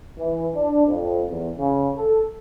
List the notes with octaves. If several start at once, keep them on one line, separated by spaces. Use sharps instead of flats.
E3
D4
F2
E2
C#3
A4